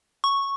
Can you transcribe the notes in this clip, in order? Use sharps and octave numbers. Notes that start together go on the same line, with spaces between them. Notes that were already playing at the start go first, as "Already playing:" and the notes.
C#6